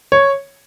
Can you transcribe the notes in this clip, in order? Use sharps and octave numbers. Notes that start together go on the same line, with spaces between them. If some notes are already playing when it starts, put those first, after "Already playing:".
C#5